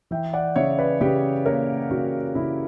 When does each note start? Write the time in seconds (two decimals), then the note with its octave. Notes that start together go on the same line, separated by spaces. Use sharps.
0.11 E3 E5 G5
0.33 D5 F#5
0.56 C#3 C#5 E5
0.78 B4 D5
1.01 C#3 G4 B4
1.46 A#3 A#4 C#5
1.91 C#3 F#4
2.35 C#3 E4